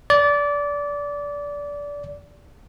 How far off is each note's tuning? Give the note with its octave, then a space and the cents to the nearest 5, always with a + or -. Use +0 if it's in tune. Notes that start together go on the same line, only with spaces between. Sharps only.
D5 -20